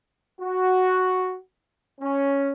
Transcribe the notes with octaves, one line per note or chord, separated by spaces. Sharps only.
F#4
C#4